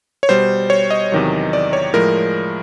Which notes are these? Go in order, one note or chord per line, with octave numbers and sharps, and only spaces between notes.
C#5
B2 G3 C5
C#5
D#5
E2 C3 D#3 F#3
D5
C#5
A2 F3 G#3 A#4